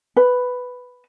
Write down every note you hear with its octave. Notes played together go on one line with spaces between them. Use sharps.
B4